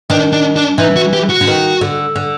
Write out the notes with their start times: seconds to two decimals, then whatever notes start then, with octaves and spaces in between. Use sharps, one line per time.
0.10 D#3 D4
0.33 D4
0.56 D4
0.78 E3 D#4
0.96 F#4
1.13 G4
1.29 F#4
1.41 D3
1.47 D#3
1.81 D3
2.16 D3